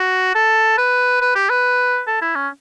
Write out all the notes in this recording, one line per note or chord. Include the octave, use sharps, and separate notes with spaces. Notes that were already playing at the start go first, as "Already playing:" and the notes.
Already playing: F#4
A4
B4
B4
G4
B4
A4
E4
C#4